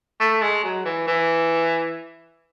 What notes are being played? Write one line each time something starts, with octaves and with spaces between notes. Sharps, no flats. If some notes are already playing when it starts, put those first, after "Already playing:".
A3
G#3
F#3
E3
E3